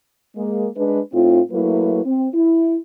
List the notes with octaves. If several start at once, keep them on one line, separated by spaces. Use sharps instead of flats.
G#3 A#3
G#3 D4 B4
A2 C4 D#4 F4
F#3 A3 A#3 E4 B4
C4
E4